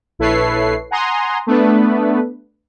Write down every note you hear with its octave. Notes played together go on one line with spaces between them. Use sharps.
A#1 E4 A4 B4 C#5 C7
F#5 G#5 A#5 C6 D#6
A3 B3 D4 B4